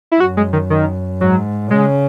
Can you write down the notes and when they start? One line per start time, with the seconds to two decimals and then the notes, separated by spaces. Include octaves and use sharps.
0.12 E4
0.19 F#2 F#4
0.37 G#3
0.53 D#3
0.70 D#3
1.21 G#2 F#3
1.70 C#3 G#3